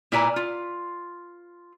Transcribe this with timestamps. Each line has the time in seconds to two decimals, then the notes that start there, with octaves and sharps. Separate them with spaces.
0.12 A#2 E4 B4 D5 G#5 A#5
0.36 F4